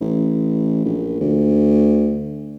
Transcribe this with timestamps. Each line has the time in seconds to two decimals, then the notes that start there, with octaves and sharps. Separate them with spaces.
0.01 A1
0.85 A#1
1.21 D2